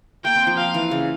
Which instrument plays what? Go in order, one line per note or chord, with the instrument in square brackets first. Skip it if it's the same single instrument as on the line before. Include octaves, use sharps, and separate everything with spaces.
[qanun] A#3 [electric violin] G5
[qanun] C4
F3
[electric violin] F5
[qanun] E3
C#3